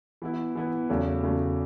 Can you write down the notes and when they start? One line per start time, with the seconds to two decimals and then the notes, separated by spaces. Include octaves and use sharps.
0.22 E3 B3 E4
0.55 E3 B3 E4
0.89 E2 C#3 F#3 A3
1.23 E2 C#3 F#3 A3